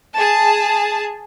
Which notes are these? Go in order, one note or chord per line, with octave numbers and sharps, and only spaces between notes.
G#4 A5